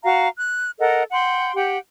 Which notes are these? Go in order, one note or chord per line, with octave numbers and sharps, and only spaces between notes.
F#4 F5 A#5
F#6
A4 A#4 D#5 F#5
F#5 G5 C6
G4 F#5 G5